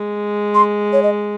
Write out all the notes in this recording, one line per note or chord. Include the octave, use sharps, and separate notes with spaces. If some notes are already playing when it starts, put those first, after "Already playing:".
Already playing: G#3
C6
C#5
D#5